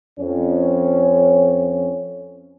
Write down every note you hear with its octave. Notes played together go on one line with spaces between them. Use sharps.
F2 C#4